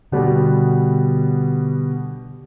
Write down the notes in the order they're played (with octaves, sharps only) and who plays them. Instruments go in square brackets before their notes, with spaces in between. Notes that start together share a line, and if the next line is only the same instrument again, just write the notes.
[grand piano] B2 G3 B3 [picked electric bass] D3